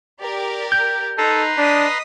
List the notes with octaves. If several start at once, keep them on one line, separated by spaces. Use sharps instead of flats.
G4 A#4 D5
G6
D#4 A4 B4 A#5 C6
D4 D#5 D#6 B6